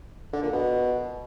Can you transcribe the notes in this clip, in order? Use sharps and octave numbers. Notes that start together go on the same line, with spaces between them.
D3
A#2
B2